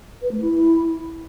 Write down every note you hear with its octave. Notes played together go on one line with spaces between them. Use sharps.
B4
A3
E4